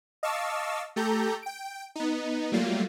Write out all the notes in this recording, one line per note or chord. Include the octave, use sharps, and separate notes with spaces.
D#5 F5 A5 C#6 D6 E6
A3 G4 A4 A#5 G6
G5 D7
B3 D#4
F#3 G3 A3 A#3 F4